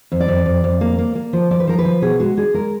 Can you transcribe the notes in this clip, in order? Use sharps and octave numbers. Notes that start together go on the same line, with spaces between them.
F2
D5
F2
F2
F2
A#3
A#3
A#3
F3
F3 D5
B4
F3 A#4
B4
F3
B2 G#4
G#3 F#4
D4 G#4
G#3 A#4